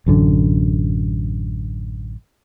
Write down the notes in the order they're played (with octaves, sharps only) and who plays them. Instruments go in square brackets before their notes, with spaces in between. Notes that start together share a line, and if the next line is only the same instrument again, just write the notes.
[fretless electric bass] A1 F#2 D3